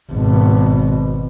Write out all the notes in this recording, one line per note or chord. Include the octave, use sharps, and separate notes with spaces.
G#1 B2